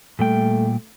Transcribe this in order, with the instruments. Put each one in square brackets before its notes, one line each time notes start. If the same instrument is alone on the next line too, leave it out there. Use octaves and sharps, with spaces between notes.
[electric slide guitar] A#2 G3 G5 [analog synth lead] A3